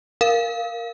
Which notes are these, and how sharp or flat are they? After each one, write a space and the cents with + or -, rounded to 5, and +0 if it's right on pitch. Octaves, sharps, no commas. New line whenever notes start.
A#4 +0 F5 +0